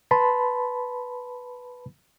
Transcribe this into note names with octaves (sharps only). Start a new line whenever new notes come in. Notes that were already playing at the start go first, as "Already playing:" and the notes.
B4 A5 B5 C6